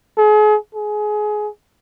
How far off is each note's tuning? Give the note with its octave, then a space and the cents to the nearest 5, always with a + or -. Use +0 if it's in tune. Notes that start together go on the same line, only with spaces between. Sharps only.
G#4 +35
G#4 +20